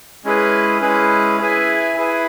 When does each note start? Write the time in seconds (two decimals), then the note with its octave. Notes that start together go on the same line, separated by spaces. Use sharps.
0.24 G#3 C#4 E4 G#4 B4
0.82 G#3 C#4 E4 G#4 B4
1.40 E4 G#4 B4 E5 G#5
1.97 E4 G#4 B4 E5 G#5